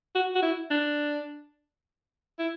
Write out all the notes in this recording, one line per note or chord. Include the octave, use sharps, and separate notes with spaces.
F#4
F#4
E4
D4
E4